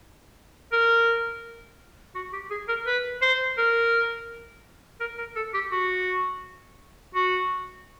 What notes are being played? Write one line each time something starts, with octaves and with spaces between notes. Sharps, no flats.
A#4
F#4
G4
G#4
A#4
B4
C5
A#4
A#4
A#4
A4
G4
F#4
F#4